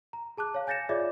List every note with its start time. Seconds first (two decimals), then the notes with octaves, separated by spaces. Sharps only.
0.13 A#5
0.37 G#4 A5 D6 F#6
0.54 C#5 F5
0.67 G#5 G6 A6 A#6 C#7 E7
0.89 F4 G#4 C#5 D5 E5 D6